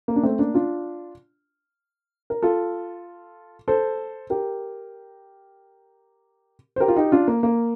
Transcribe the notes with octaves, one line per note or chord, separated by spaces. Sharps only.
A#3
D4
A3 C4
A#3 D4
D4 F4
A#4
F4 A4
A4 C5
G4 A#4
C5
G4 A#4
F4
D#4 G4
D4 F4
A#3
A#3